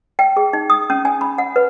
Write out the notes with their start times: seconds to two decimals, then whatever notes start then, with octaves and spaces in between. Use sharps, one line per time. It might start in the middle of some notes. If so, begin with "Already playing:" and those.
0.19 G5
0.37 G#4
0.53 D#4
0.70 D#6
0.90 C#4
1.05 G#5
1.21 B5
1.38 F#5
1.56 B4